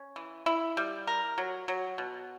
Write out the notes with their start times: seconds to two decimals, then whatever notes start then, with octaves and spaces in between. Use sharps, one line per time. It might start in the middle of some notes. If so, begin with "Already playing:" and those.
Already playing: C#4
0.16 E3
0.46 E4
0.77 G3
1.07 A#4
1.38 F#3
1.68 F#3
1.98 B2